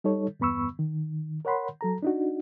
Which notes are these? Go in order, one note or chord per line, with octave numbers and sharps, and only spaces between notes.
G3 D#4 A4 C#5
E2 G2 B3 B5 C#6 E6
D#3
A#4 C#5 F#5 B5 C6
F#3 A4 A#5
D4 D#4 F#4